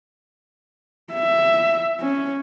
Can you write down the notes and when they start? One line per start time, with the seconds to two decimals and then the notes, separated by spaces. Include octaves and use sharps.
1.13 E5
2.01 C#4